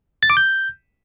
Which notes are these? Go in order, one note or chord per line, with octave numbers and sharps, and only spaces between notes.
A6
D6
G6